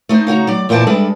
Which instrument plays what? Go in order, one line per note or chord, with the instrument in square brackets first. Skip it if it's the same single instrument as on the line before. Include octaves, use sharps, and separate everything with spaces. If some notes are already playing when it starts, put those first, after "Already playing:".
[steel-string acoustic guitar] A3 D#4 C5
C#3 D#4 F#4 A#5
F#3 D5
E2 A#2 E4 C5 D5 A5
G3 G#3 D4 A4 B4 E5